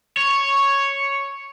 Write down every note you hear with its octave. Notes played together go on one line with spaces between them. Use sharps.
C#5